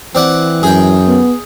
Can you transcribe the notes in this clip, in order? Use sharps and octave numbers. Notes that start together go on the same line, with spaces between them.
E3 C4 D5 F#5
F#2 G#4 G5
B3